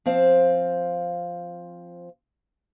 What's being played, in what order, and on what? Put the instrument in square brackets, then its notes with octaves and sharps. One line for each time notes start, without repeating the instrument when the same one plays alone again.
[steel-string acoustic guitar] F3 C4 C5 F5